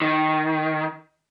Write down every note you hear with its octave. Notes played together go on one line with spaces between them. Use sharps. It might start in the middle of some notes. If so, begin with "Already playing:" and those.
D#3